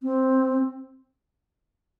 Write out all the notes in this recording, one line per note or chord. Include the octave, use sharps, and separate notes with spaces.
C4